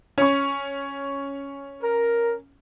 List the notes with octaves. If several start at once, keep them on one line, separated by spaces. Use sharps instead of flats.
C#4 C#5 C#6
A#4